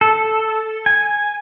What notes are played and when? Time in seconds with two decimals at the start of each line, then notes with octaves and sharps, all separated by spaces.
0.01 A4
0.86 G#5